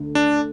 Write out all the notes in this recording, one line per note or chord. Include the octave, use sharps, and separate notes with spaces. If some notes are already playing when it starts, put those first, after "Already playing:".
Already playing: D2 D3 A3
D4